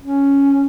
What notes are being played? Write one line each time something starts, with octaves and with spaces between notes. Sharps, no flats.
C#4